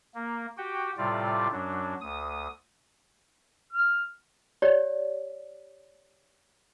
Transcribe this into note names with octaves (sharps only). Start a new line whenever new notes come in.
A#3
F#4 G4 G5
A2 C3 G3 F4 D5
F#2 F#3 D4
D2 D#6
F6
G4 C#5 D5